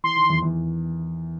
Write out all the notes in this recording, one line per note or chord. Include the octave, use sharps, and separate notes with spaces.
E3 C6
D#3
E2 E3
E2 E3